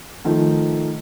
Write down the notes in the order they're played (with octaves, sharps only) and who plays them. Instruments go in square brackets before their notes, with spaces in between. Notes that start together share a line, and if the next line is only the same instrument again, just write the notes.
[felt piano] D#3 F3 A3